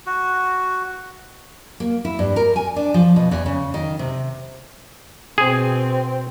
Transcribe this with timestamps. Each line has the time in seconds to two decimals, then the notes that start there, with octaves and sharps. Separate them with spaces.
0.06 F#4
1.80 A#3
2.05 E4
2.19 G2
2.36 A#4
2.56 G#5
2.76 D4
2.94 F3
3.16 B2
3.31 E2
3.46 C#3
3.74 D#3
3.99 C3
5.38 B2 C4 G#4